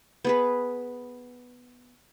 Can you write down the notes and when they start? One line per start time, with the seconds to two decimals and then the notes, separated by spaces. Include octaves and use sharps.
0.25 B3 G#4 B4